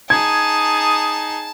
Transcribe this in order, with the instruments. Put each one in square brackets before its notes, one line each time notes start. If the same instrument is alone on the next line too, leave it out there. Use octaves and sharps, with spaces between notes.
[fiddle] D#4 G#4 [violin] A5 [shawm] D#6 [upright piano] G#6